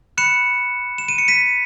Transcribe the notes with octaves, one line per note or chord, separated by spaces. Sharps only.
B5 F#6 C#7 E7
E7
D#7
C#7
B6 D#7